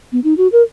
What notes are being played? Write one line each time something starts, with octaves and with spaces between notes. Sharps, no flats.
B3
D#4
F#4
A#4